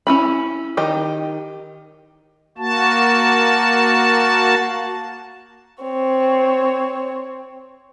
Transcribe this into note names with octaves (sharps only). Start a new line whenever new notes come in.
C#4 E4 B5
D#3 G4 D#5
A#3 F#4 A5
C4 C#5